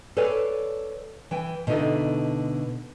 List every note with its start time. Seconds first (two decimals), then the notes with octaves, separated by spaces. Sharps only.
0.17 A4 B4 C#5 D5 F5 G#5
1.31 E3 G5 G#5
1.67 B2 D3 A3 D#4 E4 A4